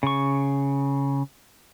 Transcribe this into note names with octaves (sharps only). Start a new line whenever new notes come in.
C#3 C#6